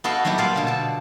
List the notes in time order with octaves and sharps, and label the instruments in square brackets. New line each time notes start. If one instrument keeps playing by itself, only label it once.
[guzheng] B3 F#4 A4 D#5 F5 G5
F#3 G3 B3 E4 G4
A#2 G3 F4 D5 D#5 F5
B2 D3
A4 A5